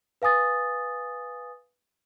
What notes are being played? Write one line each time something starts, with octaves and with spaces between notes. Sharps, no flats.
B4 F5 G#5 D#6 A6